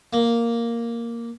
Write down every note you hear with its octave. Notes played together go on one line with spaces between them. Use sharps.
A#3